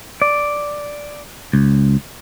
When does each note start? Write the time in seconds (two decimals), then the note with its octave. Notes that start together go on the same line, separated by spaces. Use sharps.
0.22 D5
1.53 C#2